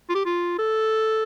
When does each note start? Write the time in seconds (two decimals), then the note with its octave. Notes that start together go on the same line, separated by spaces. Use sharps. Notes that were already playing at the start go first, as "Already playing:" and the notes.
0.10 F4
0.15 G4
0.26 F4
0.58 A4